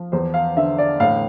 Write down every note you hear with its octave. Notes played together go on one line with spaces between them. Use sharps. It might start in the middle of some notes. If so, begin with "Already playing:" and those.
Already playing: F3
E2 C5
F5
D3 E5
D5
A2 F5